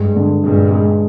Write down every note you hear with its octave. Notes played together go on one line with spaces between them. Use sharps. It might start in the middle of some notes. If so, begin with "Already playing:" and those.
Already playing: G2 G#3
D3
G2 A#2 G#3
G#3